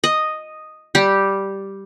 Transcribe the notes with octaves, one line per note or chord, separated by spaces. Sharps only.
D#5
G3 G4